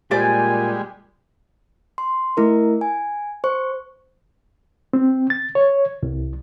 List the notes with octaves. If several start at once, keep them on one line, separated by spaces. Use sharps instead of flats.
A#2 G3 G#3 G4 C5 D5 G#5
C6
A3 E4 A#4
G#5
C5 C#6
C4
A6
C#5
C2